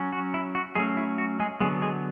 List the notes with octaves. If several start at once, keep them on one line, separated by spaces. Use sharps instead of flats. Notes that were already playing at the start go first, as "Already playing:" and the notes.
Already playing: F#3 C#4
F#4
E4
F#4
F#3 G#3 A3 C#4 G#4
E4
F#4
G#3 G#4
D3 F#3 G#3 B3 G#4
G#3 G#4